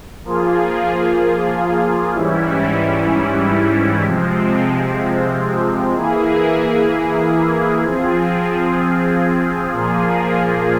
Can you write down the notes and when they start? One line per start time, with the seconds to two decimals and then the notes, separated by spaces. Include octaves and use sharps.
0.24 F3 A#3 F4 G#4
2.13 G#2 E3 G3 C#4 E4
4.03 C3 F3 G#3 C4
5.93 E3 A#3 E4 G#4
7.83 F3 C4 F4 G#4
9.73 A#2 F3 A#3 F4 G#4